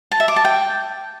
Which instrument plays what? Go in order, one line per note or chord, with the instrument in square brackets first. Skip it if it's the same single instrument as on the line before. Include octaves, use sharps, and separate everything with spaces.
[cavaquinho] A5
E5
D6
A5
G5